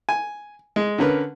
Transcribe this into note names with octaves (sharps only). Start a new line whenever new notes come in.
G#5
G#3
D3 C#4 A#4 B4